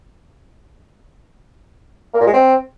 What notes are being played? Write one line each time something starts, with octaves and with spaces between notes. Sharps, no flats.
A#3
A#2
G#3
C4